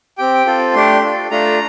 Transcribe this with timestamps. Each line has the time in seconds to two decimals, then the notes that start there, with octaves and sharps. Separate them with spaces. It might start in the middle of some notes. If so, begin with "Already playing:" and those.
0.18 C4 G4 G5
0.46 C4 F4 A4
0.74 A3 D4 G4 C6
1.03 D4 F4 A4
1.31 A3 D4 F4 A4 A#5